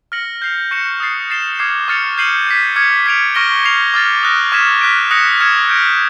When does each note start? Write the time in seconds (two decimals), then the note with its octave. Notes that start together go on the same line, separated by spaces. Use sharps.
0.12 F6 A#6 C#7 F#7
0.42 G6 C7 F7
0.71 C#6 F#6 A#6 C#7 E7
1.00 D#6 F#6 A6 C7
1.30 A6 C7 E7 G7
1.59 D6 F6 G#6 C7 E7
1.88 C#6 F6 A6 C#7 F7
2.18 G6 C7 D#7 F#7
2.47 F6 G#6 B6
2.76 D6 F6 G#6 C#7
3.06 G#6 B6 D7 F7
3.35 C#6 F6 A#6 D7 G7
3.64 G6 C7 F7
3.94 D6 F6 A6
4.23 D#6 F#6 A#6 D7
4.52 C#6 F6 G#6 B6 E7
4.81 F#6 B6 D7
5.11 D#6 F#6 A#6 C#7 E7
5.40 F6 G#6 C#7 E7
5.69 G6 A#6 D7